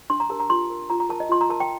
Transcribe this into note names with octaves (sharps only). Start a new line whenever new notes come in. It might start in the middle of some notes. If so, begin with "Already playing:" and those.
D4 C6
A#5
G4 A#4 A5
A#5
F4 C6
A#4
F4 A#5
A#5
A#4 A5
D#5
F4 C6
A#5
A#4 A5
G5